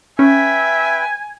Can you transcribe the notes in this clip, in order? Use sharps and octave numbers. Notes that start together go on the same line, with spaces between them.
C#4 B4 E5 G5 G#5